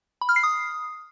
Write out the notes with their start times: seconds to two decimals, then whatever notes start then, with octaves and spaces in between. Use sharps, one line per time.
0.21 B5
0.29 F6
0.36 C7
0.43 D#6